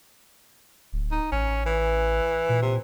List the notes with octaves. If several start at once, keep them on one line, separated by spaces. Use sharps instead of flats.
D1
D#4
A1 C#4
E3
A#2
C3